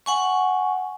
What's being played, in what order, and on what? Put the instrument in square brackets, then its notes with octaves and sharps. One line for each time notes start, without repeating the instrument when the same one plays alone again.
[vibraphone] F#5 G#5 C#6